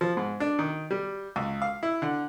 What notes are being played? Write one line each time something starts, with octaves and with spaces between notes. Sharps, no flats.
F3
G#2
D4
D#3
G3
C#2
F5
E4
D3